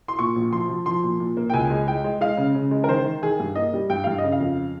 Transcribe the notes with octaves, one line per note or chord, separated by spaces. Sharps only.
C6
A#2 C#6
A#1
F3 C6
F3
F3 C6
A#2
A#2
A#3
G5
C#2 G#5
G#3
G#3 G5
G#3
G#3 F5
C#3
C#3
G#3
A#4
D#3 C5
D#3
D#3 G#4
G2
A#3 D#5
G3
G2 G5
G2 F5
C#3 D#5
F5
F2